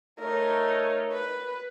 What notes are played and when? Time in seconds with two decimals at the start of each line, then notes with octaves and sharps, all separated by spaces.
0.19 A3 D#4 A#4 C#5
1.12 B4